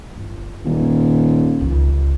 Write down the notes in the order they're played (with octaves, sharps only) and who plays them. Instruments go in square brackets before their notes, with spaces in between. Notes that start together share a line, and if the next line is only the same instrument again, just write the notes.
[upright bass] G1
[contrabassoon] D#1
[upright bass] C#2 C#3